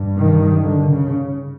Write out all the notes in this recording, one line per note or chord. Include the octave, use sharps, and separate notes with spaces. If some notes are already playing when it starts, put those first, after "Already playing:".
Already playing: G2
D#3
D3
C#3